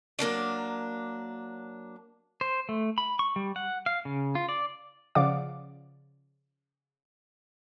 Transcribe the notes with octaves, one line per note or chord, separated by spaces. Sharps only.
F#3 A#3 D4 D5
C5
A3
B5
C#6
G3
F#5
F5
C#3
F4
D5
C#3 F3 D5 F5 F#5 D6